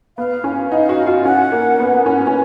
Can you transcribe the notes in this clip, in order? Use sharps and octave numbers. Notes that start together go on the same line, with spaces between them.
B3 F5
C#4
D#4 F#5
F5
F#4
F4
C#4 F#5
A#3
B3
C#4
C#4